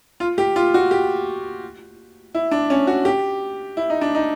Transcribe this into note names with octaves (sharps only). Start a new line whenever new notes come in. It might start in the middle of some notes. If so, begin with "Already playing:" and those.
F4
G4
F4
F#4
G4
E4
D4
C#4
F#4
G4
E4
D#4
D4
D#4